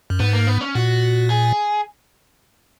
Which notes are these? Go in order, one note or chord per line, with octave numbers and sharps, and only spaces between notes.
F#2
G#2 B3
A#3
B3
C#4
A#2 F#4
G#4